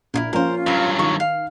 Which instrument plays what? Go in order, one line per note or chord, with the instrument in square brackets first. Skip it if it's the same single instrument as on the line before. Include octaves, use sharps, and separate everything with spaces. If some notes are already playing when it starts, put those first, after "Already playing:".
[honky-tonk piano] A#1 [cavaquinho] E4 F4 A#4
[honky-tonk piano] F3 A#3 C#4 [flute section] F4 [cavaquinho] A#4 C5
[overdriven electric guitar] G2 F#3 [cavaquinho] F5 B5
[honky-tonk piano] D#3 [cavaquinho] C#6
[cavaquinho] F5